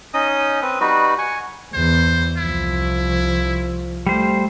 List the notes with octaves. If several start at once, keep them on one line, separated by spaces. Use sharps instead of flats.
C#4 D#4 D#5 D#6
C4 B4 D#6
G3 D#4 F#4 B4
F#5 G#5 C#6
E2 C5
C2 F3 E4
G3 A3 C5